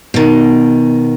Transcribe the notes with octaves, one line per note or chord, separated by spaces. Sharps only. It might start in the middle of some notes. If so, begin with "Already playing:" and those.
B2 D#3